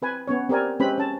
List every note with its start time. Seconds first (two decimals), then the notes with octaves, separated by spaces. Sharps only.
0.02 C4 B4 G#5
0.28 B3 C#4 C#5
0.49 C4 G4 A#4 D5 G#5
0.80 G#3 C4 C#4 G4 B4 B5
0.98 C#4 A5